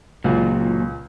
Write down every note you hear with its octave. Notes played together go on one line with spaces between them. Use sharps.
C#2 A#2 F#3